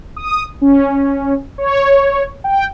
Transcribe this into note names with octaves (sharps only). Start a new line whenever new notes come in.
D#6
C#4
C#5
G5